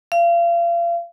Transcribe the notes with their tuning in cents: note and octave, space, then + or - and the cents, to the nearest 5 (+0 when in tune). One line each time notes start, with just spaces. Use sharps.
F5 -35